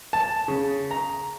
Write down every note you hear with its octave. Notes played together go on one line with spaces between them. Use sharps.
A5
C#3
A#5